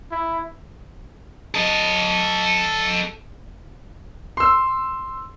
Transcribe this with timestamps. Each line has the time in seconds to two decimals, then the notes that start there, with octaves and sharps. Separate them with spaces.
0.11 E4
1.55 A4 D#5
4.37 C6 E6